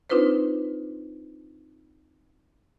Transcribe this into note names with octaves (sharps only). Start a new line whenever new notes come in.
C4 D4 D#4 F4 B4 C5